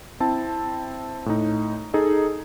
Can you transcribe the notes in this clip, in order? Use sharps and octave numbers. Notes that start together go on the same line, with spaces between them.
C4 E4 A5
A2 D#4
D#4 G#4 A4 D#5